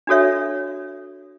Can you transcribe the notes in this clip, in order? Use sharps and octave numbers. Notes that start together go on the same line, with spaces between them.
D4 F#4 A4 C#5 E5